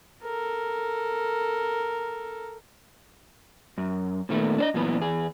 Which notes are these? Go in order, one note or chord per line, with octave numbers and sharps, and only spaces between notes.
A4 A#4
F#2
A#2 D#3 A3 B3
D4 C5 D#5
F#2 A#2 E3 B3
E2 G#4